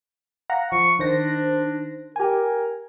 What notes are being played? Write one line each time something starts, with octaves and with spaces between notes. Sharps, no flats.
F5 F#5 A#5
F3 C#6
D#3 D4 C5 A#6
G4 A#4 G#5